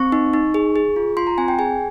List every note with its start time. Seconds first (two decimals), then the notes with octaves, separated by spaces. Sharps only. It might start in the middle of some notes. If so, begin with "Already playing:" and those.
Already playing: C4 C#6
0.12 D#4
0.33 D#4
0.54 G#4
0.76 G#4
0.96 F4
1.17 F4 C6
1.27 A#5
1.38 C4 G#5
1.48 G5
1.59 G#4 G#5